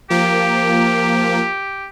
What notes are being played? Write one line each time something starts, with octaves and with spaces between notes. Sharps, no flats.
F3 A#3 G4